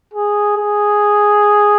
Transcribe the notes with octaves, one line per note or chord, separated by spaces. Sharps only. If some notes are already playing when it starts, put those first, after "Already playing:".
G#4
G#4